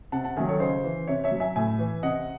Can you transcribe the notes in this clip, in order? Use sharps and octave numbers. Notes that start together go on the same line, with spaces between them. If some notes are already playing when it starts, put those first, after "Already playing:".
C3 F#5 A5
F#5 A5
D#3 F#3 E5 G#5
A4 C#5
C#3 C5 D#5
E3
C3 C#5 E5
C#5 E5
F#3
E5 G#5
A2 E5 G#5
E3
C3 D#5 F#5